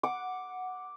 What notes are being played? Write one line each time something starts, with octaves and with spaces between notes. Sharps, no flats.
F#5 D6